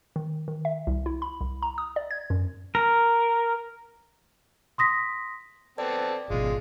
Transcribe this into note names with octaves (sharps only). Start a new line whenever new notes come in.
D#3
D#3
E5
C2
E4
B5
C2
A#5
D#6
D5
G#6
F#2
A#4
C6 D#6 A#6 B6
B3 C4 A4 D5
G#1 B2 G#3 F4